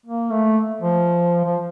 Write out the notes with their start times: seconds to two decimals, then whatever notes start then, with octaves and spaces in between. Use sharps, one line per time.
0.06 A#3
0.31 A3
0.81 F3
1.45 F3